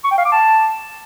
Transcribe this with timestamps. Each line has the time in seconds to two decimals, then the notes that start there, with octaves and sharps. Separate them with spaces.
0.04 C#6
0.11 G5
0.18 F5
0.25 D6
0.32 A5